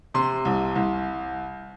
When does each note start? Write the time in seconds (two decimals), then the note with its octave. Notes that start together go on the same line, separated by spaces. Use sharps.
0.14 C3 C6
0.45 C2
0.76 C2